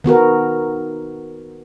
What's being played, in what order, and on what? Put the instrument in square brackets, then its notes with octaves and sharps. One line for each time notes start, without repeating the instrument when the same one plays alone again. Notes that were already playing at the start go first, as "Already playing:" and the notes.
[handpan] D#3 B3 F#4 A#4